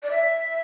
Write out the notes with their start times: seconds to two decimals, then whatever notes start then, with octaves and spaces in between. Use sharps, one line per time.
0.03 D5
0.11 E5